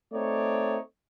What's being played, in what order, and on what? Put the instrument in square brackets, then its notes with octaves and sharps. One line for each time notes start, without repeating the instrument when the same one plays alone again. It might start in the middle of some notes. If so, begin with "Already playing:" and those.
[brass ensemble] A3 C4 D#4 C#5 D5